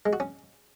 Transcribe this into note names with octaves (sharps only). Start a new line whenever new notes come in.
G#3
F#4
C#4